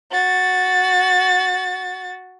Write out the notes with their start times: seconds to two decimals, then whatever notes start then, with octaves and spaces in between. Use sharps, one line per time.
0.12 F#4 A6